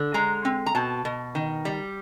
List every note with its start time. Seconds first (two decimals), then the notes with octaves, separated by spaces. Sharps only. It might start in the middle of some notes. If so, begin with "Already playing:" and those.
Already playing: D3
0.14 G#3 A#5
0.45 C4
0.66 A#5
0.75 B2 A5
1.05 B2
1.35 D#3
1.65 G3